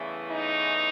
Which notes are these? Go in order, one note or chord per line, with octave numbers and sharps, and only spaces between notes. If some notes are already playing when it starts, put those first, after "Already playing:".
Already playing: E2 C#3 E3 A3
D#4